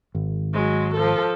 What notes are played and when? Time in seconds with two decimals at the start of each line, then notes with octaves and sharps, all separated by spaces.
0.15 G#1
0.53 F#3 G#3
0.94 F3 A4